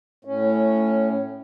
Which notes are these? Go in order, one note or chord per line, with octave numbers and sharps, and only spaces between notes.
A2 C#4